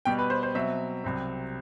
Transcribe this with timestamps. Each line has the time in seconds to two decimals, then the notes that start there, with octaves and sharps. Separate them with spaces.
0.05 B2 G3 B3 G5
0.19 B4
0.30 C5
0.43 C5
0.55 B2 F#3 C4 E5
1.04 C2 C3 F#3 C4